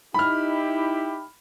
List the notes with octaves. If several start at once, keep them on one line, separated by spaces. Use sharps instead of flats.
D#4 E4 G4 B5 F6